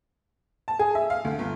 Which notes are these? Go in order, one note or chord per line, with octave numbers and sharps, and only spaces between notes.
A5
G#4
E5
F5
D2
G1